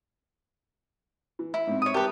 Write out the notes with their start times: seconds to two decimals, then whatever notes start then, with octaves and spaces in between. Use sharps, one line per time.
1.39 E3
1.54 E4
1.67 G#2 C4
1.82 C#5 D#6
1.94 G4 A#4 B4 A5